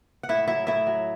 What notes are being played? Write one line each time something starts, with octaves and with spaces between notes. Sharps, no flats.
F#5
A2 E4 E5
F#3 E4 E5
A2 E4 E5
F#3